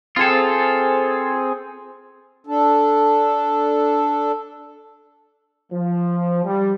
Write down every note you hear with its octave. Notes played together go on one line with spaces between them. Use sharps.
C4 F4 G#4 A4
D4 A4
F3
G3